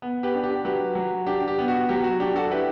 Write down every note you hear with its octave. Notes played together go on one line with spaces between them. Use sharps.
B3
G4 B4
D4
G4
F#3 G4 B4
F#3
D4 G4
G4
B3
F#4
F#3 G4
F#4
D4 G4
F#4 A4
E4 G4 B4